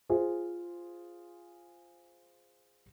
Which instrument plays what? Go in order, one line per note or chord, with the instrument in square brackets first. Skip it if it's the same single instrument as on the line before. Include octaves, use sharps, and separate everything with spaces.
[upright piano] F4 G#4 C5